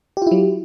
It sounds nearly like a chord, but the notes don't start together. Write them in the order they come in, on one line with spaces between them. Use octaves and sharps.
G4 F4 E4 F#3